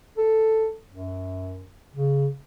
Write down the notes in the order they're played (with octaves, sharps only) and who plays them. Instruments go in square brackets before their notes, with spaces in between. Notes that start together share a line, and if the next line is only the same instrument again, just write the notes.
[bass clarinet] A4
F#2
C#3